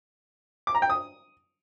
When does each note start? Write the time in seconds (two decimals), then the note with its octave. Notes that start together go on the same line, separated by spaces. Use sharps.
0.67 D6
0.75 A#5
0.82 G5
0.90 D#6